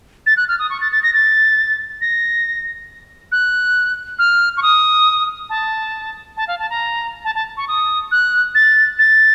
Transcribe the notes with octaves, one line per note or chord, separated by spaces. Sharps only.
A6
F#6
F6
D#6
C#6
A6
A6
A#6
A6
A#6
F#6
F6
C#6
D#6
A5
A5
F5
A5
A#5
A5
A5
C#6
D#6
F#6
A6
A6